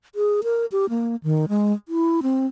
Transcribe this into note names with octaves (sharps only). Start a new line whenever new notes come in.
G#4
A#4
G4
A#3
D#3
G#3
E4
C4